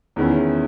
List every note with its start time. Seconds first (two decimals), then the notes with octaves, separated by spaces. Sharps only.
0.16 E2 D#3 G#3 C#4 E4